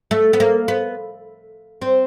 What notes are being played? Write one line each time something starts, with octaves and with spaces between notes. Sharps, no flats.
A3
B3
A#3
B3
C4